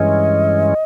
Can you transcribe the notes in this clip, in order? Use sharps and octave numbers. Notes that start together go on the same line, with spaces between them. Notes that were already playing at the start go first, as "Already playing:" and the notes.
Already playing: G2 E3 G#3 C#4 D#5